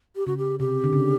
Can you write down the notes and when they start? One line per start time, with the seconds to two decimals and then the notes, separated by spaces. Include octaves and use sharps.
0.16 G4
0.27 C#3 F#4
0.38 G4
0.59 C3 G4
0.84 D3
0.93 C#3